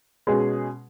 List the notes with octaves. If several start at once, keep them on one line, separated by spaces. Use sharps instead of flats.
B2 G#3 C#4 G#4